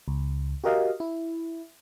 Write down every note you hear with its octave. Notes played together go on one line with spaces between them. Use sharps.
C#2
F#4 G4 A#4 D#5 F5
E4